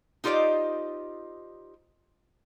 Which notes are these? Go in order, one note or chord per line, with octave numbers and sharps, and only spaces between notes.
D#4 F4 G4 C5 D5 D#5